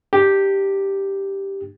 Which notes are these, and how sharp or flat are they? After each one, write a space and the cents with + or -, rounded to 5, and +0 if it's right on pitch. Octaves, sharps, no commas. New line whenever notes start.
D4 +45 G4 +0